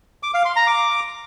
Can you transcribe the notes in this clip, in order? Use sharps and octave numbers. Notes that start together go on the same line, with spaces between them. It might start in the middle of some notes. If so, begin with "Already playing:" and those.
D6
F5
C6
A#5
D6